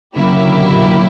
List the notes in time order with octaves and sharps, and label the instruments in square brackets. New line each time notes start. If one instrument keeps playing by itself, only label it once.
[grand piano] C#3 [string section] F#3 A#3 E4 G4
[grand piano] C#3
D3
B2
A#2
A#2